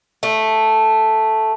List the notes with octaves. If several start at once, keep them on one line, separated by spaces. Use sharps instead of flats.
A3